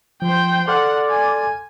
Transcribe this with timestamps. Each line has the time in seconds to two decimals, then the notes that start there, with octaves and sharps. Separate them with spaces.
0.22 F3 C5 G5
0.68 A4 D5 F#5 C6 F6
1.10 G#5